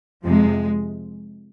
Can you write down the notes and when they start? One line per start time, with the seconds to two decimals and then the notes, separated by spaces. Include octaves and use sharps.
0.24 F2 C3 F3 G#3